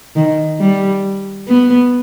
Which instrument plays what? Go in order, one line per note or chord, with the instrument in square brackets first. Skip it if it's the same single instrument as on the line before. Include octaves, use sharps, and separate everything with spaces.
[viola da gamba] D#3
G3
B3